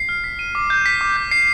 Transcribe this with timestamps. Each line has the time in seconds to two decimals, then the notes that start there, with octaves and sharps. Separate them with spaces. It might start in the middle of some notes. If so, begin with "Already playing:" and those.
Already playing: C7
0.09 F6
0.24 B6
0.39 D#7
0.55 D6
0.70 G6
0.86 B6
1.01 D6
1.17 G6
1.31 C7